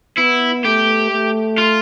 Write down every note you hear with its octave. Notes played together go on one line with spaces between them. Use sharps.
B3 E4
A3 G4
A3
F4